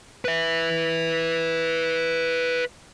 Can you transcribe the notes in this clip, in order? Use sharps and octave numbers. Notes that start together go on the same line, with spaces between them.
B4 E5